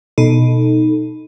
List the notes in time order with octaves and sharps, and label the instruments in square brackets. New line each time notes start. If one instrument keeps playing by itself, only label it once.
[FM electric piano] B2 D#4 A4